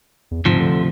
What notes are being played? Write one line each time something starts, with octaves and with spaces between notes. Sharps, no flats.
E2
D2 G#2 C3 F3
D3